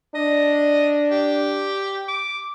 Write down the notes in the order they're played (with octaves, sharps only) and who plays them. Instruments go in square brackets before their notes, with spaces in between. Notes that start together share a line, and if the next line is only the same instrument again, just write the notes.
[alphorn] D4 [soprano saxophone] D#5
[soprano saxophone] G4
D6